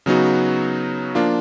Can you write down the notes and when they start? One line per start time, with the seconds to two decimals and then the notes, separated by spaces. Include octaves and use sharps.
0.06 C#3 F#3 B3 D#4 F#4
1.15 F3 A#3 D4 F4